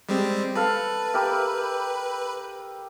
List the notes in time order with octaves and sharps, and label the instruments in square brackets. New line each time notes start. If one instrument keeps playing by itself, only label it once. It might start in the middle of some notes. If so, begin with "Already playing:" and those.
[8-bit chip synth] G3 G#3 C4
[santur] A4 F5 [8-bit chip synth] B4
[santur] G4 A#4 E5